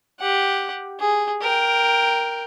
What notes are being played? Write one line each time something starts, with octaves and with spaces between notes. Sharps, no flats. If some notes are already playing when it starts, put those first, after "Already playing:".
G4 F#5
G#4
A#4 G5